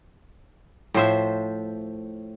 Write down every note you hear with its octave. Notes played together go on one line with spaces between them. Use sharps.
A2 F3 C5 E5